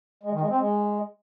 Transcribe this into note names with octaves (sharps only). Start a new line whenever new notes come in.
G#3
D#3
G#3
C4
G#3